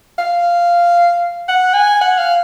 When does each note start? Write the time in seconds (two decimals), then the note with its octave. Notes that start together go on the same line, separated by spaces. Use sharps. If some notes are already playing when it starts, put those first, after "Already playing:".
0.18 F5
1.49 F#5
1.74 G#5
2.01 F#5
2.18 F5